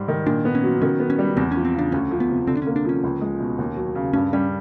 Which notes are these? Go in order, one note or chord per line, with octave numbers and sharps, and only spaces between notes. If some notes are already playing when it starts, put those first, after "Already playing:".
Already playing: G#2 G3
D#3
A#2 D4
B3
C#4
F#3
D#3 C#4
B3
C#4
G3
E2 C4
F3 C#4
C4
C#3 D4
D2 C#4
F3
B3
C3
D3 C4
D4
A#3 C#4
D4
F3 C#4
C#2
G#3
B2
D#2
F#3
C#3
G2 C#4
G3 C#4